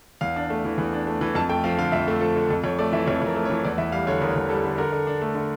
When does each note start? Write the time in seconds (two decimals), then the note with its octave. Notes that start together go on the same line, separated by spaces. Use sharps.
0.21 E2 F5
0.36 D4
0.50 A3
0.65 E3
0.78 E2
0.93 D4
1.07 A3
1.21 E3
1.35 F2 A5
1.49 A3 G5
1.64 F3 F5
1.78 D3 F5
1.92 F2 E5
2.08 A3
2.21 F3 A4
2.36 D3
2.50 F2 A4
2.64 F2 C#5
2.79 A3 D5
2.93 E3 E5
3.06 F2 C#5
3.22 F2 A#4
3.36 A3
3.45 C#5
3.50 E3
3.64 E2 D5
3.78 E2 E5
3.92 G3 F5
4.07 D3 C#5
4.22 E2 A#4
4.36 E2
4.49 G3 A4
4.65 D3
4.78 D3 A#4
4.92 D3
5.07 D4
5.22 A3
5.35 D3